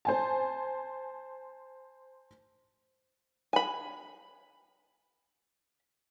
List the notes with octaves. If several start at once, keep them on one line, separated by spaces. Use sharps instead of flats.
C5 G#5 A5
G#5 B5